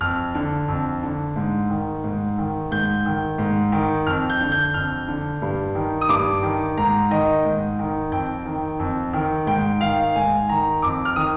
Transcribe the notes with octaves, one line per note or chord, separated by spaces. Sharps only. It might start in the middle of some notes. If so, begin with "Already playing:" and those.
F2 F6
D3
F2
D3
G#2
D#3
G#2
D#3
G#2 G6
D#3
G#2
D#3
F2 F6
G6
D3
G6
F2 F6
D3
G2
D#3
D#6
G2 D6
D#3
G#2 A#5
D#3 D#5
G#2
D#3
F2 G5
D#3
F2
D#3
G#2 G5
D#3 F5
G#2 G#5
D#3 A#5
F2 D6
F6
D#3 D#6